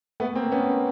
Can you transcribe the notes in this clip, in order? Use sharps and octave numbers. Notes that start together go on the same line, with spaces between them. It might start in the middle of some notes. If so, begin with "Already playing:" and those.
A3 B3
A#3 C4
B3 C#4